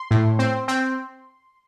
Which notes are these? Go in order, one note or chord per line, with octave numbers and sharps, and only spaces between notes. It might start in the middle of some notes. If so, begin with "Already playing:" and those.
Already playing: C6
A2
C4
C4